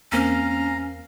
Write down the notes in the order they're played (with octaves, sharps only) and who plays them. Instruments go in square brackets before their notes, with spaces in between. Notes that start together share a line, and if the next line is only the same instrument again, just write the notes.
[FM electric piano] E2 A#3 C4 [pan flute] C#4 [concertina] F5 A#5